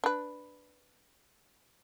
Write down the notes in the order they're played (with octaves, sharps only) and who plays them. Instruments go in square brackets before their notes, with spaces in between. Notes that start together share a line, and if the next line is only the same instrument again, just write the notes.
[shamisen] D4 B4